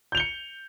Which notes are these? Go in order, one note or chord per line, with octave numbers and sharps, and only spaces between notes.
G6 C#7 F7 G7